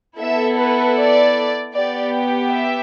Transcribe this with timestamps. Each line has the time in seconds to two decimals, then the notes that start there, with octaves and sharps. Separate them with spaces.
0.20 B3 E4 A4 E5
0.58 B4
0.97 D5
1.74 B3 G4 D5
2.50 E5